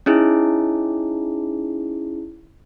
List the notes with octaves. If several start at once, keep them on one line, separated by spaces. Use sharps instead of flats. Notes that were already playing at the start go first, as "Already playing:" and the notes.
C#4 D#4 E4 G#4